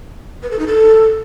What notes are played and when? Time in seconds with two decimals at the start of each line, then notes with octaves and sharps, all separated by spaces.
0.43 B4
0.51 A4
0.59 D#4
0.67 A4